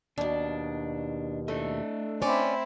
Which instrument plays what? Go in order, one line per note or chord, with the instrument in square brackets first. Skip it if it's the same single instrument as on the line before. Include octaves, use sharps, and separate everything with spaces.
[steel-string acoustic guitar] D#2 B2 [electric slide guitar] D4 [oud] D5
[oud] A3 [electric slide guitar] D4 D#5
[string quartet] C4 E4 [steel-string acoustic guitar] C#4 D5